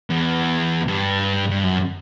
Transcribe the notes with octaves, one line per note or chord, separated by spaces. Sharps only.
E2
G2
G2
F#2